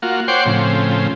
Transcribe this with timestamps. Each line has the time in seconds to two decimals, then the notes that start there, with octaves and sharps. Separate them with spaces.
0.02 A#3 F4 F#4
0.28 C5 C#5 F#5 G5 C6 D6
0.45 A2 C#3 F3 C4